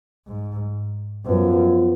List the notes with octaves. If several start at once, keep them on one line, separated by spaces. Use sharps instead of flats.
G#2
F#2 F3 B3 F4 B4